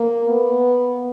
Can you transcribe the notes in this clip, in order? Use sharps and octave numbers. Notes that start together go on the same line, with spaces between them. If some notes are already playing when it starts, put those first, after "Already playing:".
Already playing: A#3
B3